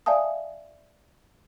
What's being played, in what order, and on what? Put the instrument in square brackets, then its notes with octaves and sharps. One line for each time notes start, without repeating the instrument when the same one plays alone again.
[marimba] D5 E5 F5 G#5 A5 D#6